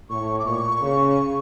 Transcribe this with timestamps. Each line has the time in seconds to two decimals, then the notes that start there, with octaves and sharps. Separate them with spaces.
0.10 A2 C#6
0.39 D6
0.46 A#2 C#6
0.81 C#3